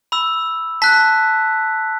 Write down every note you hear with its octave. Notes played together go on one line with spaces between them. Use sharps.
B5 E6
A5 F#6 B6